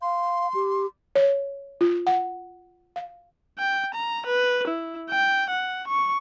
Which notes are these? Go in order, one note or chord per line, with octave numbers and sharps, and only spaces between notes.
F5 C6
G4
C#5
F4
F#5
F5
G5
A#5
B4
E4
G5
F#5
C#6